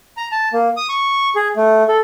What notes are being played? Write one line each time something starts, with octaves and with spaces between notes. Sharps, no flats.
A#5
A5
A#3
D#6
C#6
G#4
A3
A4